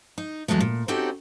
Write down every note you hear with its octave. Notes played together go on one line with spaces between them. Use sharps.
D#4
E2 G#2 F#3 G#3 A3
A#2
C4 C#4 D#4 F#4 G4 A4